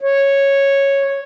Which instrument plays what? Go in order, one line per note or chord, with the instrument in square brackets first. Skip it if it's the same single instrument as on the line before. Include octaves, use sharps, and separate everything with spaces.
[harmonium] C#5